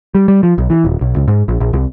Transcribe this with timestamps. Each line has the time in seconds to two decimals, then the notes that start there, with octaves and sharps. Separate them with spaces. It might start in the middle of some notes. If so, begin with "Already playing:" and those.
0.15 G3
0.28 G3
0.43 F3
0.58 B1
0.70 E3
0.85 D#1
1.01 B1
1.16 C#2
1.28 G#2
1.48 A#1
1.60 A#1
1.73 C2